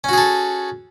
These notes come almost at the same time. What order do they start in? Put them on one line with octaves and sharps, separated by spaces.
C#4 F#4 G#4 A4